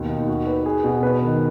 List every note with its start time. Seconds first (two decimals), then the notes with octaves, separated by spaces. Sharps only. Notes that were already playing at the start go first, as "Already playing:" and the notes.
Already playing: D#2 B2
0.10 D#4
0.28 F#4
0.47 B4
0.66 G#4
0.84 B2
1.03 B4
1.22 D#3